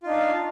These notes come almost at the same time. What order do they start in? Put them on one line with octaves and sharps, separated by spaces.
F4 D#4 D4 F5